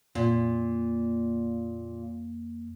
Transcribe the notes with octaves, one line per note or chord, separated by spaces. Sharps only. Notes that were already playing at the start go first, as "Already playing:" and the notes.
F2 A#2 A#3